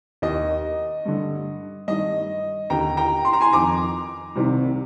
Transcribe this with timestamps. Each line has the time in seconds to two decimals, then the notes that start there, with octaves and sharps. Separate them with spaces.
0.22 D#2 D#3 D#5
1.05 G2 D3
1.88 G2 D#3 D#5
2.70 D#2 D3 G5 A#5
2.97 G5 A#5
3.25 C6
3.33 A#5
3.41 G#5 C6
3.52 F2 D#3 A#5 D6
4.36 C2 C3 D#3